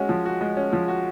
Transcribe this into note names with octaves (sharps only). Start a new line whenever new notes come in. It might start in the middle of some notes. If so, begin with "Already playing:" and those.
Already playing: G#3 C#4 F#4
F3
F#4
G#3
C#4
F3
F#4